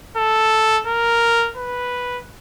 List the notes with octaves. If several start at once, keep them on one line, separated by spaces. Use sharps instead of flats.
A4
A#4
B4